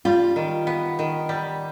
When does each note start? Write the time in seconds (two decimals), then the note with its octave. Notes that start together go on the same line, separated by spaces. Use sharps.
0.05 G3 F4
0.36 D#3
0.67 B3
0.99 D#3
1.29 G3